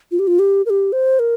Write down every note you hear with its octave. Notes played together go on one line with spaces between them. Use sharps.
F4
G4
F4
G4
A#4
G4
C5
A#4